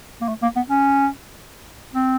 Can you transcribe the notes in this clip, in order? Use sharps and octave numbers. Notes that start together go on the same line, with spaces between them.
A#3
A3
A#3
B3
C#4
C4